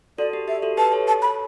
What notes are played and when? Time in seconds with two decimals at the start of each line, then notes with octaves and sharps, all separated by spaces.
0.18 F#4 A4 D5
0.33 G4
0.48 G4 E5
0.62 F#4 A4
0.77 G4 B4 A5
0.92 A4 C#5
1.08 A5
1.22 B5